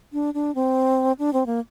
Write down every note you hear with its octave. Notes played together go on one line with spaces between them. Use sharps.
D4
D4
C4
D4
C4
A#3